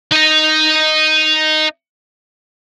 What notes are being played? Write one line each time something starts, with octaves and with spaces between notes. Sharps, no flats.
D#4 D#5